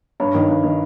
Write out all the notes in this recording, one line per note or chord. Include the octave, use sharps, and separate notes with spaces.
G2 C#5
D#3
G2
D#3